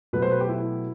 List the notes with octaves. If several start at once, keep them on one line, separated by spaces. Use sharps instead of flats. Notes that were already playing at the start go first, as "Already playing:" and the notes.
B2 F#3 A3 B4
C5
B4
G4
E4